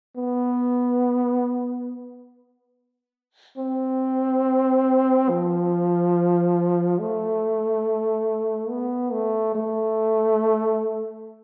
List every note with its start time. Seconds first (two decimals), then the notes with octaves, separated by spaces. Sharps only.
0.17 B3
3.58 C4
5.29 F3
6.99 A3
8.70 B3
9.12 A3
9.55 A3